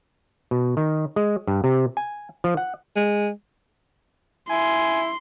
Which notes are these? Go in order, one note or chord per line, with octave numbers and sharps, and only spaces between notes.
B2
D#3
G#3
G2
C3
G#5
F3
F#5
G#3
E4 G#5 C6